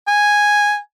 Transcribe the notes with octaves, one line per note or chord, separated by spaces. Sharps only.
G#5